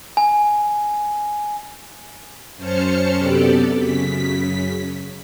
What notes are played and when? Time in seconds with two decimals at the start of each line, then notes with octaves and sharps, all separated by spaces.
0.17 G#5
2.56 F#2 C#4 C5 A5 F6 C#7
3.16 F#2 C3 B3 G4 A4 D5
3.77 F#2 C#3 B6